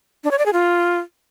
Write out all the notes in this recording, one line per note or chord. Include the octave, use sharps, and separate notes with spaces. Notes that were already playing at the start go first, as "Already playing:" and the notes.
D4
C#5
D5
G#4
F4